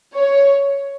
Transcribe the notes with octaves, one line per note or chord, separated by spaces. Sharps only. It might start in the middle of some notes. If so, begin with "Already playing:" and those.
C#5